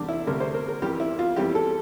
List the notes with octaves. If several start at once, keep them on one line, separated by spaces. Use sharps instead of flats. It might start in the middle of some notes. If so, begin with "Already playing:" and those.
Already playing: E2 C3 G3 D4
E4
D2 C3 G3 A#4
C5
A#4
A#4
F2 E3 G3 G4
E4
F4
F2 E3 G3 G4
A4